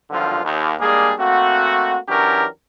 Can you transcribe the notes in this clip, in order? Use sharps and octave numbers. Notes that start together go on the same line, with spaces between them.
G#1 G2 D3 F3 F#3 F4
D#2
G3 G#3 A#3 D4 G#4
A3 A#3 C4 F#4
E3 F#3 C#4 D4 G4 A#4